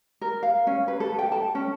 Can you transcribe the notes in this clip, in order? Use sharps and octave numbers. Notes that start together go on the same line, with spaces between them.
A#4
F5
C#4
B4
A4
G5
A5
C#4